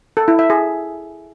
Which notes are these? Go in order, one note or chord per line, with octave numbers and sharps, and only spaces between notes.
A4
E4
E5
G#4